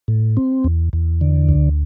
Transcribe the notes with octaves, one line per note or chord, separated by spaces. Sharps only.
A2
C4
E2
E2
D3
D2